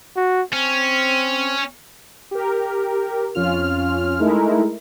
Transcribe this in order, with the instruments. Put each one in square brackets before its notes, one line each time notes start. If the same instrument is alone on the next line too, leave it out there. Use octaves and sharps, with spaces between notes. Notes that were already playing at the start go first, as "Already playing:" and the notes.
[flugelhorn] F#4
[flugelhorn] C4 [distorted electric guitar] C#4
[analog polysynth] G4 A#4
F2 C#4 F4 F6
G#3 A3 D#4 E4 A#4